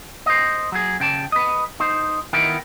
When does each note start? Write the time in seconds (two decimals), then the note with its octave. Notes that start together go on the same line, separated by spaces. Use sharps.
0.26 C5 D#5
0.72 F#3 G#4
1.00 C#3 G5 A5
1.32 B4 D#5
1.80 D#4 C5
2.33 D#3 B3 E4 A#4 G5